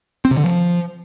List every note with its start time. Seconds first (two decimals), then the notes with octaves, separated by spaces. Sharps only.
0.25 C4
0.31 C3
0.37 D3
0.44 F3